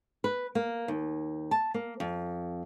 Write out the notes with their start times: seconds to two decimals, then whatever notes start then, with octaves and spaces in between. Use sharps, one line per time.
0.24 B4
0.55 A#3
0.88 D#2
1.51 A5
1.74 A#3
2.00 F2